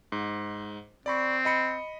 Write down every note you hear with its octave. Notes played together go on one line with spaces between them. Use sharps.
G#2
C4 D5 B5 C#6
D#5 B5 C#7